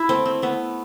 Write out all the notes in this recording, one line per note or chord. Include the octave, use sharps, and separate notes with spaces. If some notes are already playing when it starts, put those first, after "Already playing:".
Already playing: E4
A3 C4
C4
A3 B3